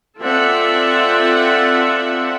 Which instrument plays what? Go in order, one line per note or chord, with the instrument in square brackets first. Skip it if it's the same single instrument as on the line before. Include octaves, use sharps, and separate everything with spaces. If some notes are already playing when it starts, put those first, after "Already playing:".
[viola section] C4 F4 A4 D5 E5 F#5